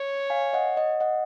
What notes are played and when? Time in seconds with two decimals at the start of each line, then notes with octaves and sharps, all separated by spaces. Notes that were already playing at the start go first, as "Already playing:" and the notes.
Already playing: C#5
0.30 F5 G#5
0.53 D#5 F#5
0.77 D#5 F#5
1.00 D#5 F#5